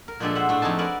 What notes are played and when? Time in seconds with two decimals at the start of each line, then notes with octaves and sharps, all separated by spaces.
0.08 A#4
0.20 A#2 F3 G#3 D4 G4 A4
0.35 C5 E5 F#5
0.49 A2 A3 D4
0.62 F2 A3 C4 D#4 G#5 A5
0.78 A#4 B4 D5 E5 F#5 G#5